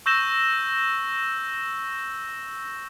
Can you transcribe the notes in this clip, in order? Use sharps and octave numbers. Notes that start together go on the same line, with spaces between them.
C#6 E6 G6 A#6 E7 G7